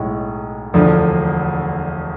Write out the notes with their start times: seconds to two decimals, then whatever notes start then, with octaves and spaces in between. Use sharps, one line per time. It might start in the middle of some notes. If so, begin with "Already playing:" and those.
Already playing: B1 A2 G#3
0.74 E1 D2 D3 F3